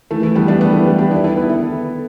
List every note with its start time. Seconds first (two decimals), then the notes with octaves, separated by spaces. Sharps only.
0.11 E3 A3
0.23 E3 A3
0.35 G3 B3
0.48 A3 D4
0.61 G3 B3
0.73 E3 A3
0.86 G3 B3
0.98 D4 G4
1.11 B3 E4
1.24 E4 A4
1.37 B3 E4
1.49 E4 A4